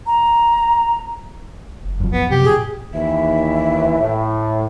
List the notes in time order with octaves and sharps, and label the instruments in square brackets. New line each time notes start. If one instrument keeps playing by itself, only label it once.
[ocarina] A#5
[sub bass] F#1
[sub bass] F1 [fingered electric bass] F#2 F3
[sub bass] B1 [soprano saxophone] B3
[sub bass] C3 [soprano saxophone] G4
[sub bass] A#2 [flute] G#4
[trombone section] D#2 E3 [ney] E5
[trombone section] A2